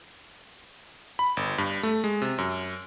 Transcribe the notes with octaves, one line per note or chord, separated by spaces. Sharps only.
B5
G1
G2
A3
G#3
C3
F#2